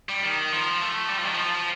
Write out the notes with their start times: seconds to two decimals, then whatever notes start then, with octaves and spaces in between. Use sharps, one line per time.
0.09 G3
0.23 D#3
0.52 F3
0.81 A3
1.09 G3
1.18 F3
1.25 D#3
1.34 F3